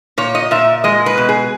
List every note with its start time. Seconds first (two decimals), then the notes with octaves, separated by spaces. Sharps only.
0.18 A#2 C#5
0.35 D#5
0.51 A#2 E5
0.84 G#3 D#5
1.06 B4
1.18 B2
1.29 G#4